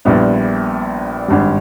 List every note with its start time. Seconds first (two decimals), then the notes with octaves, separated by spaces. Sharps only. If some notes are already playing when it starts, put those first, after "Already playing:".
0.05 A#1 A#2 G3 B3 E4
1.28 G#1 G2 G3